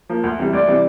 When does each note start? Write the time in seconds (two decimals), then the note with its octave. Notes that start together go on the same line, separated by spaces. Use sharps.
0.09 F3 A#3
0.24 D2
0.39 C3 E3 G3
0.53 D2 D5
0.68 C3 E3 G3